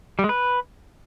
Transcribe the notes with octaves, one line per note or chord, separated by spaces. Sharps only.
G3
G#3
B4